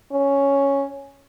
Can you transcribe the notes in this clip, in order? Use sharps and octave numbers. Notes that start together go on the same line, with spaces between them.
C#4